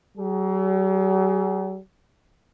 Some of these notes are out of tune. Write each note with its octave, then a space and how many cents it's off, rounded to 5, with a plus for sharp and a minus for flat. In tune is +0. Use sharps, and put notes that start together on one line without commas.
F#3 +45 G#4 +0